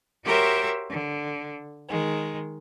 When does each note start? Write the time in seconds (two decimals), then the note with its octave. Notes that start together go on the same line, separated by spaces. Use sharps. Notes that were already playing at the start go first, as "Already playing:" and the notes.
0.24 F#4 G4 A#4 C5 C#5 E5
0.89 D3
1.88 D#3 G#3